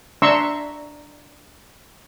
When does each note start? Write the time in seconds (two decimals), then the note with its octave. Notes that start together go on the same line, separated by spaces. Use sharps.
0.22 D4 E5 A#5 C6 C#6 E6